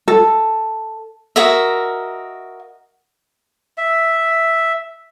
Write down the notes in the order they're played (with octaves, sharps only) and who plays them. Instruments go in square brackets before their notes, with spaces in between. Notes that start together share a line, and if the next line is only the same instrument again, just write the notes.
[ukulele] A4
[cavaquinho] F#4 A#4 D#5 E5
[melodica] E5